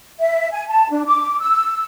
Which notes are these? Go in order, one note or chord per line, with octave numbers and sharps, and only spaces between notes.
E5
G#5
A5
D4
D6
E6